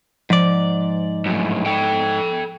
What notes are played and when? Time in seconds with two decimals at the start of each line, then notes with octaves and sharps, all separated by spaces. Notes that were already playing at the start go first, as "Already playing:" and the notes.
0.30 G#2 F3 D5
1.26 F#2 A2
1.66 A4 G5